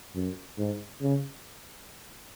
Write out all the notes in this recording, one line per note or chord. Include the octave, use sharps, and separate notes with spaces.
F#2
G#2
C#3